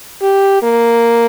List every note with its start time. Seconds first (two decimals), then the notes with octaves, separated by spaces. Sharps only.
0.22 G4
0.62 A#3